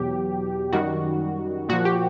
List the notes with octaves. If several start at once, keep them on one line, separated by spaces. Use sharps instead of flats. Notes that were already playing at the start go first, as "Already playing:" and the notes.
Already playing: E2 B2 F#3 G4
F#2 D#3 G3 F#4
A#2 F3 F#4
G4